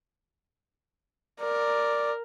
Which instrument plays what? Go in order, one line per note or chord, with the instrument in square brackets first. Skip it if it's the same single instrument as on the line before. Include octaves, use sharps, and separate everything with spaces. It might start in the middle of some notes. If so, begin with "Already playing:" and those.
[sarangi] A#4 [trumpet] D5